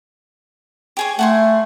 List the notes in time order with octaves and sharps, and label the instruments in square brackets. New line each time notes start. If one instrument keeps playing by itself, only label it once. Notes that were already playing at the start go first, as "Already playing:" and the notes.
[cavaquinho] G4 G#4 C#5
[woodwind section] A3 [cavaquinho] F#5 G#5 C6